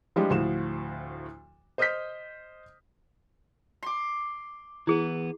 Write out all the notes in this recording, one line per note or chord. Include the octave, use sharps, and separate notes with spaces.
F3 G3 G#3 D4 G4
D2 A2 F3 F#4 E7
C5 D#5 D#6 F6 G6 B6
C6 D6
E3 B3 E4 G#4